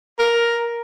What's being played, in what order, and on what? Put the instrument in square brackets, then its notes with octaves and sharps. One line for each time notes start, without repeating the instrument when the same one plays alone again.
[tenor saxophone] A#4